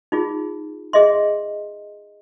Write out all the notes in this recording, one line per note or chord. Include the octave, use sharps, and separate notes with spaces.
D#4 F4 G#4
G#4 D#5 E5 C6